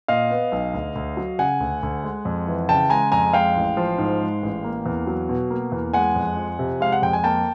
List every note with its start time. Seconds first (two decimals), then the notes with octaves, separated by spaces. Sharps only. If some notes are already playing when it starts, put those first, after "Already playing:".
0.08 A#2 D#5 F5
0.30 B3
0.52 B1
0.74 D2
0.95 D2
1.17 F#3
1.38 C#3 F#5 G#5
1.60 D2
1.83 D2
2.04 G#3
2.25 F2
2.47 E3
2.69 C#3 G5 A5
2.90 G#3 G#5 A#5
3.12 F2 G#5 A#5
3.33 G#3 F5 G5
3.55 A1
3.77 F3
3.98 G#2
4.20 G#3
4.42 A1
4.64 A#3
4.86 E2
5.07 F#3
5.29 B2
5.50 A#3
5.72 E2
5.94 G#3 F#5 G#5
6.16 F2
6.37 F3
6.59 C3
6.80 G#3 F5
6.92 F#5
7.02 F2 G5
7.13 G#5
7.24 A#3 G5 A5